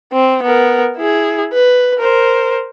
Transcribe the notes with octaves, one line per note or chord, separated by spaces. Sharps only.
C4
B3 A#4
E4 G#4
B4
A#4 C5